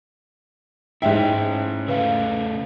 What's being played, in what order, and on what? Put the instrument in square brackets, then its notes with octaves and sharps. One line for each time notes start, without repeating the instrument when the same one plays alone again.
[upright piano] G#2 E5 [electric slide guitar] C#4 E4 [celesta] G5
[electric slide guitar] C#3 A3 [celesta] B4 F5